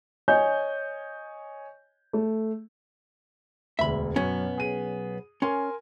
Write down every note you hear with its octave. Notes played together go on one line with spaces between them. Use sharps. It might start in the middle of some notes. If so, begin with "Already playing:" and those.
C#5 D#5 G#5 G6
A3
E1 D2 E5 B5
B1 F#2 B3 C#4
G#4 D#7
C#4 A#4 G#5 C6